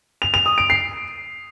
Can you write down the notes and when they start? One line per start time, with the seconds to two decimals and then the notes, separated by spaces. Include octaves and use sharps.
0.22 F7
0.34 F7
0.46 D#6
0.58 D7
0.70 C7